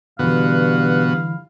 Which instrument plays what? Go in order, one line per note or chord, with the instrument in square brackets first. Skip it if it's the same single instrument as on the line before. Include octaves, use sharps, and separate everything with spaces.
[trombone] G2 [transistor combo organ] B2 B3 F#4 [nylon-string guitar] D3 E3 [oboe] F5